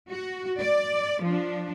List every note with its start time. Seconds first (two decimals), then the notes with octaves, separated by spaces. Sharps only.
0.12 F#4
0.61 D5
1.23 F3 D4